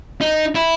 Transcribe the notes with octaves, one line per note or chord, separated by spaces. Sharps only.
D#4
E4